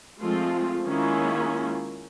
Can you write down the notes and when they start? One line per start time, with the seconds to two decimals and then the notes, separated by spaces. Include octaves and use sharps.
0.21 F3 G#3 A3 C4 F4
0.86 D#3 G#3 A#3 C#4 E4 F4